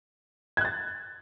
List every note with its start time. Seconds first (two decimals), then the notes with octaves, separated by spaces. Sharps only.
0.57 G#6
0.61 F#6
0.65 A6